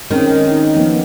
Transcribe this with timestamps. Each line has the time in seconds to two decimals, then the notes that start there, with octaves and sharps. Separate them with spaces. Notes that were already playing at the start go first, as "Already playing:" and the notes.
0.11 D#3 G#3 C4 C#4
0.51 D#4
0.76 F3 A#3 B3